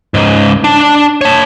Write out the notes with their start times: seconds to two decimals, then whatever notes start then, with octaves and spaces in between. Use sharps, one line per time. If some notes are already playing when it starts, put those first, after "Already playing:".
0.14 C#2 G#2
0.64 D4 A5
1.21 C#5 A5